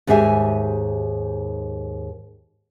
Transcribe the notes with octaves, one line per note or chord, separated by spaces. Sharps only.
D#2 G#2 G4 G#4 E5 G#5